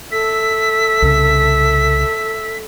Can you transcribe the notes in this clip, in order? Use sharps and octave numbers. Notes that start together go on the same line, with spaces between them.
A4 E5 B6
C2 C#3